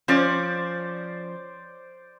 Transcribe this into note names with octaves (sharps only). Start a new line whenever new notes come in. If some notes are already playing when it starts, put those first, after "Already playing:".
F3 C#4 C5 D5 D6